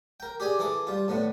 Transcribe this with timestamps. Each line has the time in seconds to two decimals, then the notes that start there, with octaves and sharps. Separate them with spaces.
0.20 A#4 G5
0.40 G4 G#4 D5 G#5
0.59 E3 G#4 A4 D6
0.87 G3 F4
1.08 A2 D3 B3